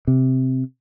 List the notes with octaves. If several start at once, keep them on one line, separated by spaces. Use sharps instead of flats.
C3